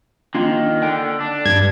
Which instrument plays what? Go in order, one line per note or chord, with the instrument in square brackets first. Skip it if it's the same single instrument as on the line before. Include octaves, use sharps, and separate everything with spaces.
[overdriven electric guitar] D#3 [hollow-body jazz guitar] A#3 D4 F4
[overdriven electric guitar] D3 [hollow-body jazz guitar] G5
[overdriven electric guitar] D4
[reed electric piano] G2 [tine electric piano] G#6